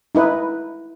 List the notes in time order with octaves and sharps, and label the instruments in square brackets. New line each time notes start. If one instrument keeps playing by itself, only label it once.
[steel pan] D#4 E4 B4